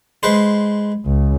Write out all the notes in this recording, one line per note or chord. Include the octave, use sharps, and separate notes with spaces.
G#3 B4 C5
C#2